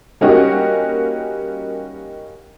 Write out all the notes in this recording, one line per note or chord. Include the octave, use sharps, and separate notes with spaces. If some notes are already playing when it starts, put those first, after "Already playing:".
G3 A#3 C#4 D#4 F#4 G4